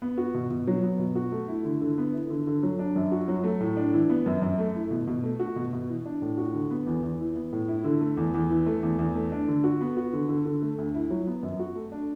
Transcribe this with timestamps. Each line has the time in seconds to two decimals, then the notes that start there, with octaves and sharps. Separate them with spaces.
0.02 B3
0.18 F#4
0.35 B2
0.50 B2
0.67 F#3
0.83 B3
0.99 B2
1.15 F#4
1.32 A3
1.48 E4
1.64 D3
1.81 D3
1.98 B3
2.13 E4
2.30 D3
2.47 D3
2.63 F#3
2.79 D4
2.96 F#2
3.12 F#4
3.28 F#3
3.44 A3
3.60 A2
3.77 D4
3.94 E3
4.10 B3
4.26 F#2
4.42 F#2
4.58 A3
4.74 E4
4.91 B2
5.07 B2
5.24 A3
5.39 F#4
5.56 B2
5.73 B2
5.89 E3
6.05 D4
6.22 A2
6.38 F#4
6.53 D3
6.71 B3
6.87 E2
7.03 E2
7.20 E3
7.36 B3
7.53 A2
7.68 E4
7.84 D3
8.01 A3
8.17 E2
8.34 E2
8.50 E3
8.66 A3
8.83 E2
8.99 E2
9.15 A3
9.32 D4
9.48 D3
9.64 F#4
9.81 B3
9.97 F#4
10.13 D3
10.29 D3
10.45 D3
10.62 A3
10.78 D2
10.94 E4
11.10 F#3
11.27 B3
11.43 F#2
11.59 F#4
11.75 A3
11.92 D4